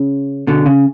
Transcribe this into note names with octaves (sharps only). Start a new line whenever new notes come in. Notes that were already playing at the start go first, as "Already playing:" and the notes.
Already playing: C#3
B2 D3
C#3